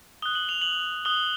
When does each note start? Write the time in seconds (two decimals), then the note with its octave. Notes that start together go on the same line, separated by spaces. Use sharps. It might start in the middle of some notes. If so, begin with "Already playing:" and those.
0.22 D#6 F#6 G7
0.35 F#7
0.49 F7
0.62 F#7
1.05 D#6 F#6 G7